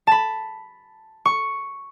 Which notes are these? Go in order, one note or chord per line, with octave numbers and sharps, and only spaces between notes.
A5 B5
C#6